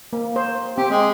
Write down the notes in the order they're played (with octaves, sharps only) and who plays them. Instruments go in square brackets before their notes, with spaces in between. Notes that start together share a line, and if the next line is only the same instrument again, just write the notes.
[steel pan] A#3
C5
[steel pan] C4 [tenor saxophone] G4
[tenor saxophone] G#3